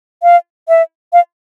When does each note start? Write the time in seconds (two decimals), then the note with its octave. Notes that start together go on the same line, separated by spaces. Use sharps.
0.23 F5
0.68 E5
1.13 F5